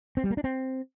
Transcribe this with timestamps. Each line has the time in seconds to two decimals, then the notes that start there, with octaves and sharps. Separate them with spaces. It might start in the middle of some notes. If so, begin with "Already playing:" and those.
0.17 C4
0.24 G3
0.30 A#3
0.37 D4
0.44 C4